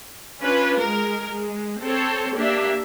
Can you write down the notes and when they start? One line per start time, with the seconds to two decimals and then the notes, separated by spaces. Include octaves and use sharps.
0.41 C#4 D4 F4 B4
0.79 G#3 A#4
1.30 G#3
1.81 C4 A4 C5 C#5
2.37 A#3 D4 G4 E5